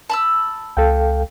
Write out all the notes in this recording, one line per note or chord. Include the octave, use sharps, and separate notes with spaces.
A5 B5 E6
C#2 A4 F5 G5